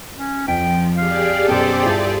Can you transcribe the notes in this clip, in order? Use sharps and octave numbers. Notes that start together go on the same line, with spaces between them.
C#4
F2 F3 G5 B6
G4 G#4 D5 F5
F#2 B2 A4 C5 G5
G2 E4 F4